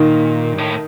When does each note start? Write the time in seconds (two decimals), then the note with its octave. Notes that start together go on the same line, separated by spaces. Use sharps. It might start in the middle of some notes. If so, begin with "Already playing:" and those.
Already playing: A#2 D#3
0.53 G2
0.58 A2